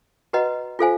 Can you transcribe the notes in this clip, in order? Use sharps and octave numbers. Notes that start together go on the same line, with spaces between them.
F#4 B4 D#5 F#5 A#5
F4 A4 C5 F5 G#5